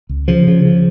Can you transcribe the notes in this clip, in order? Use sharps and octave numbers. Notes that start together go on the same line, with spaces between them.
C#2
C#3 F3
C#3
C#3